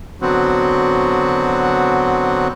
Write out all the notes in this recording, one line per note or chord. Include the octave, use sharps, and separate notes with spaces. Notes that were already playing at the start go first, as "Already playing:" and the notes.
D3 F#3 B3 C4 F#4